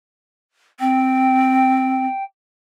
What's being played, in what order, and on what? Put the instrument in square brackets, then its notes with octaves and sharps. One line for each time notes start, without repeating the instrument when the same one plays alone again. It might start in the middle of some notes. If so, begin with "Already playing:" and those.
[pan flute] C4 [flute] G5